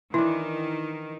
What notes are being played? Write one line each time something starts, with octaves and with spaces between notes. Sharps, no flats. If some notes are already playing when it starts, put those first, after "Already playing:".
D#3 E3 D4 E4